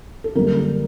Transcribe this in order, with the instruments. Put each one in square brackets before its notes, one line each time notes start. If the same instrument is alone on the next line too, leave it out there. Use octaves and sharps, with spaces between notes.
[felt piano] A4
F#2 D3 G3 A#3 A#4
A4